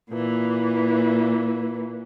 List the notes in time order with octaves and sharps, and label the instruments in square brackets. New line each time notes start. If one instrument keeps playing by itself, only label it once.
[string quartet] A#2 E3